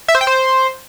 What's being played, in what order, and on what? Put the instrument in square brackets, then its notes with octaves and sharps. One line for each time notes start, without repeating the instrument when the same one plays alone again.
[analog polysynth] E5
C5
G5
C5